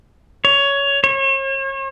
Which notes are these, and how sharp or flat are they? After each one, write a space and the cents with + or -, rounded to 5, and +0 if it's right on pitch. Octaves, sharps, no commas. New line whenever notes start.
C#5 +15
C#5 -40